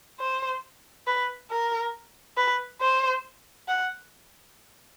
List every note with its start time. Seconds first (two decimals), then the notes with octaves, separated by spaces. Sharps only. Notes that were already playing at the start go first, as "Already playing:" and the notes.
0.20 C5
1.07 B4
1.51 A#4
2.37 B4
2.81 C5
3.68 F#5